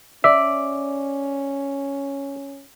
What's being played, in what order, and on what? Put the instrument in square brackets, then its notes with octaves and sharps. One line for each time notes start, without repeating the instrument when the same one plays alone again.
[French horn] C#4 [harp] D5 [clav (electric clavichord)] E5